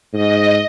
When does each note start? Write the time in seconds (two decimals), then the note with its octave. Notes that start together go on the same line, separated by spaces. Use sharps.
0.12 G#2 D#5